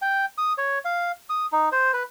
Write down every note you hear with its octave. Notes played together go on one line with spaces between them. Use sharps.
G5
D#6
C#5
F5
D#6
D#4
C5
B4